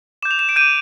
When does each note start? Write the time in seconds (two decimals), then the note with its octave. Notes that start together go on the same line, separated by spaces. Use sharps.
0.23 D6 G6 E7
0.31 F7
0.39 E7
0.49 D7
0.56 D6 G6 D#7